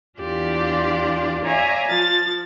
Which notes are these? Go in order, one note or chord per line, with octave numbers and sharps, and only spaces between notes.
E2 D4 F4 G4 D5
C#5 D5 E5 F5 G#5 A#5
F3 A6